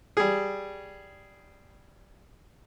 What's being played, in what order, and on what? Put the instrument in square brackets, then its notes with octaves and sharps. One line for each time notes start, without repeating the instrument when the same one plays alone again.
[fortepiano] G3 G#4